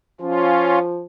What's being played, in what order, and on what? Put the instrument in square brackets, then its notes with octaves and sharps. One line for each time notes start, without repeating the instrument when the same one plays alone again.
[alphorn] F3 [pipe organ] C#4 F4